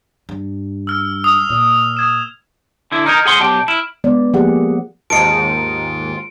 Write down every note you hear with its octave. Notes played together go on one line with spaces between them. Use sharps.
G2
E6 F6
D#6 F7
A#2
D#6 G#6 E7
D3 E4
D#4 A#4 F6 G6 G#6
G#4 F#5 C6
B1 G4 G5 A5
E4 F6 D7 E7
G#3 B3 D5
F3 A#3 G4 G#4 F#5
D#2 G#2 D#3 F4 A5 C#7 D7